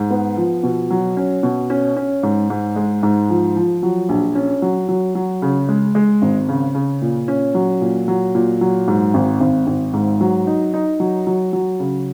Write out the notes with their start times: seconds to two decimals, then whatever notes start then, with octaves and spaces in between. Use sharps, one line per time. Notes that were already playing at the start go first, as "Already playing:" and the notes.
Already playing: G#2
0.11 B3
0.37 F3
0.63 B2
0.91 F#3
1.17 C#4
1.43 B2
1.70 C#4
1.96 C#4
2.23 G#2
2.50 G#2
2.76 G#3
3.03 G#2
3.30 F3
3.56 F3
3.83 F#3
4.09 A#1
4.35 C#4
4.62 F#3
4.89 F#3
5.15 F#3
5.42 C#3
5.69 G#3
5.95 G#3
6.22 G#1
6.49 C#3
6.75 C#3
7.02 A#2
7.28 C#4
7.55 F#3
7.81 A#2
8.08 F#3
8.35 A#2
8.61 F#3
8.88 G#2
9.14 G#1
9.41 G#1
9.67 G#1
9.93 G#2
10.21 F#3
10.47 D#4
10.74 D#4
11.00 F#3
11.27 F#3
11.53 F#3
11.80 C#3